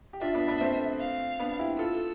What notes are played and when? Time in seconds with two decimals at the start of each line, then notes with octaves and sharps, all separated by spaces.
0.13 G4
0.21 D4 F4 E5
0.34 B3 D4
0.48 B3 D4
0.61 A3 C4
1.01 F5
1.39 B3 D4
1.59 E4 G4
1.79 F4 A4 E6